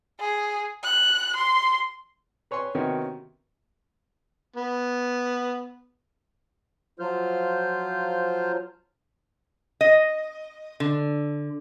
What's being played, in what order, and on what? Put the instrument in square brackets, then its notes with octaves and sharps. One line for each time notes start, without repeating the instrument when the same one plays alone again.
[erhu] G#4
F#6
C6
[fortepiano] B4 C#5 G#5 C6 C#6
C3 D#3 B3 C#4 F#4
[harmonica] B3
[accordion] F3 F#3 F4 C5 F6 G6
[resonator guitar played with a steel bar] D#5
D3